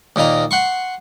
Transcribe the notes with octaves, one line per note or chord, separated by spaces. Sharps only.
D#2 A#2 A#3 D#5 A#5
F#5 C6 C#6